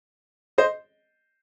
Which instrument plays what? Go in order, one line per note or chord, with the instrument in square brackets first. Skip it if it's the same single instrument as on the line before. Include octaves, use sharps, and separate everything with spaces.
[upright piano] C5 D#5